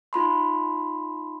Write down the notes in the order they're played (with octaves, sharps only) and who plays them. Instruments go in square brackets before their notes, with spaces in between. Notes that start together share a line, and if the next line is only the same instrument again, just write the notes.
[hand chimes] D#4 F4 B5 C6